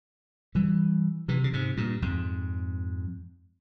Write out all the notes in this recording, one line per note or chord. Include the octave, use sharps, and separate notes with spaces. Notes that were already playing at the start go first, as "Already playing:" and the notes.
E3 G3
C3 E3
C#3
G#2 C3
G2 A#2
F2 G#2